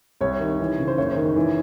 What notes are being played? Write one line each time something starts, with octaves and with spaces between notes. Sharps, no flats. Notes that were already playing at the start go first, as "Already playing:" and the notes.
C2 C#5
D#3
E3
C#3
C5
F#1 C#5
D#3
E3